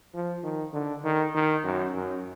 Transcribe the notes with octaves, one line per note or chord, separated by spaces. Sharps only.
F3
D#3
D3
D#3
D#3
F#2
F#2